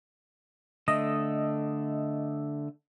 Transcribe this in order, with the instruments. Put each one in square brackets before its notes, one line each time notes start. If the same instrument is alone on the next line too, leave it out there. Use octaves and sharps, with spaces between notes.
[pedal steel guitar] D3 A3 A4 [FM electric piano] D#5